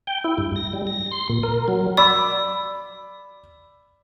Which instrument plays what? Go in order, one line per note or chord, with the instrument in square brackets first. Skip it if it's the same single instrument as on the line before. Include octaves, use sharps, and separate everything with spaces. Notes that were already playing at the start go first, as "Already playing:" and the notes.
[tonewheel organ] G5
E4
G2
A#6
G3
A#6
C6
A#2
A#4
F#3
[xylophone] D5 [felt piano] B5 D6 E6